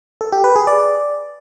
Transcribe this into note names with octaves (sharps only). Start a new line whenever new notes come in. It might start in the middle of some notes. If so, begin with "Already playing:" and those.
A4
G4
B4
G#4
D5